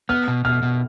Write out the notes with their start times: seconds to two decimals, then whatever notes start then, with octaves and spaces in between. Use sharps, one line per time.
0.09 B3 F6
0.28 B2
0.45 B2 F6
0.63 B2